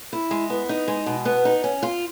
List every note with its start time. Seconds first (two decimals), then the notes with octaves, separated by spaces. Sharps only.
0.13 E4
0.31 G#3
0.50 B3
0.69 D#4
0.88 G#3
1.06 B2
1.25 B3
1.45 D#4
1.64 C#4
1.83 F4